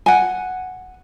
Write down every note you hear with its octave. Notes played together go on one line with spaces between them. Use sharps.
F#5 G#5